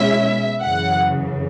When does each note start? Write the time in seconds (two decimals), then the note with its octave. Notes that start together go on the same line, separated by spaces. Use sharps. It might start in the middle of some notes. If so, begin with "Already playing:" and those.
Already playing: B2 G#3 C#4 E4 E5
0.61 F#2 C#3 E3 F#5